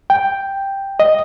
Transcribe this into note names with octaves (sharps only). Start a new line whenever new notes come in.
G5
D#5